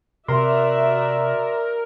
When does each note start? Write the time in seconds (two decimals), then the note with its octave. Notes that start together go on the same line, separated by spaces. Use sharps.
0.28 C3 F#4 A#4 D5 E5 C6